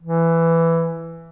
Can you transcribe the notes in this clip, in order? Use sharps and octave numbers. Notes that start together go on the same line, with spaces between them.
E3